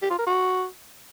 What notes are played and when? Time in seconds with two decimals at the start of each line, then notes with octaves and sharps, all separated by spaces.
0.02 G4
0.10 F4
0.19 A#4
0.27 F#4